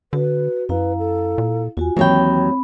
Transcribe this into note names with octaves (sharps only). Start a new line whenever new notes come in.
D3 F#4 B4
F#2 E4 B4 F5 A#5
A4
A#2
E2 F4 F#4 G#5
D#2 E3 F#3 C4 C#5 G5 B5